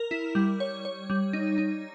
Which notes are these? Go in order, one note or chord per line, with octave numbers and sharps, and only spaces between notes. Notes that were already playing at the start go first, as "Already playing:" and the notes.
Already playing: A#4
E4
G3
C#5
C#5
G3
D#4
D#4